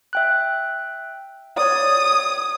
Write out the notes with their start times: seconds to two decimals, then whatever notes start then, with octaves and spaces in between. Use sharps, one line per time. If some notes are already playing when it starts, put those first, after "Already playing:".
0.13 E5 G5 F#6
1.57 C#5 D5 D#6